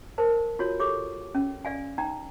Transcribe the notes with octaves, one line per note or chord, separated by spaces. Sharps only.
A#4 C5 A5
F4 F#4 C#5
G4 A4 C#5 D6
C#4
D5 F5 G#5
D#4 G5 A#5